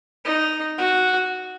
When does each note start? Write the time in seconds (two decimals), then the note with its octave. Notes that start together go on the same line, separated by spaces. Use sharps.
0.25 D#4
0.78 F#4